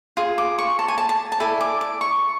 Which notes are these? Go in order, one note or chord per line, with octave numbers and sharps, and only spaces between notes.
F4 G#4
D6
C#6
A5
G#5
A5
A5
A5
E4 A4 D5 G#5
D6
D6
C#6